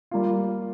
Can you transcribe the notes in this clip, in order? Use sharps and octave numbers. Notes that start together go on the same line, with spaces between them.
G3 A#3 F4